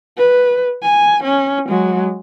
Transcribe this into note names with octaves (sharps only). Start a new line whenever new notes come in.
B4
G#5
C#4
F#3 G#3